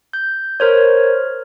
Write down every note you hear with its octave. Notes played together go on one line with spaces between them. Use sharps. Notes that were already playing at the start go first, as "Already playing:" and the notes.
G6
A#4 C5 C#5